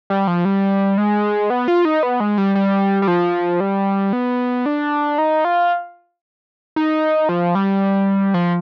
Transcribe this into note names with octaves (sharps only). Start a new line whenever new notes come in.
G3
F3
G3
G#3
B3
F4
D#4
B3
G#3
G3
G3
G3
F3
G3
B3
D4
D#4
F4
D#4
F3
G3
F3